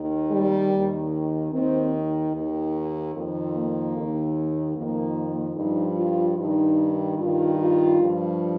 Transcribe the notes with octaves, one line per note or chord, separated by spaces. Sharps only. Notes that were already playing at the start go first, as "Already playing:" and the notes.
Already playing: D#2 D#3
G3
D#2 D#3
D#2 D#3 C4
D#4
D#2 D#3
F2 D#3
A#3
D#2 D#3
F2 D#3 A#3
G2 F3 D#4
F4
G2 D#3 D#4
G2 D#3 F4
F4
G2 F3